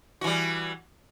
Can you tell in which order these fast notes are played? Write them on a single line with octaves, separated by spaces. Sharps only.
F#4 E3 G3